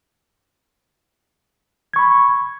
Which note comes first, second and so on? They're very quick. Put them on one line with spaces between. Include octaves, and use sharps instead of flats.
G#6 C#6 B5